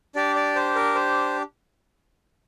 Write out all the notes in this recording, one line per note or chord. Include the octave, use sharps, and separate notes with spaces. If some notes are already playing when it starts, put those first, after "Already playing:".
D4 G4 D5
D5
C5
A#4
C5